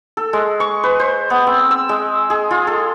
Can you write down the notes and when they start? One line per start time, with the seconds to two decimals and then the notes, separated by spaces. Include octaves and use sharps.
0.17 A4
0.33 G#3
0.60 C#6
0.84 B4
1.00 C5
1.30 B3
1.47 C4
1.71 E6
1.89 G#3
2.30 G#4
2.51 F4
2.67 A4